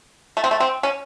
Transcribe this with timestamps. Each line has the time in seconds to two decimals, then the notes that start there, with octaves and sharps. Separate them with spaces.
0.37 A3
0.44 C4
0.51 A3
0.60 C4
0.83 C#4